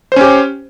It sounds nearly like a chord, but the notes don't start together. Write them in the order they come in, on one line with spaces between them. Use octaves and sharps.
C5 C#4 G4